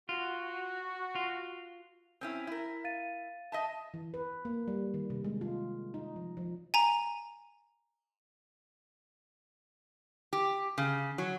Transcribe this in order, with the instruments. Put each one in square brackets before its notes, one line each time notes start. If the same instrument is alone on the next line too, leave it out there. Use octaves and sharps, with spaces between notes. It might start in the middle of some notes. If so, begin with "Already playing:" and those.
[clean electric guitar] F4 [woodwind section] F#4
[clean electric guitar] F4
[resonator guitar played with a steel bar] C4 C#4 E4
E4 A#4
[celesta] F5 A6 D#7
[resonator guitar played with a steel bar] D#5 E5 A5
[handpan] E3
B4
A#3
G3
D#3
C3
G#3
F4
D#4
F3
F3
[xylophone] G#5 A#5
[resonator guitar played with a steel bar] G4
C#3
F#3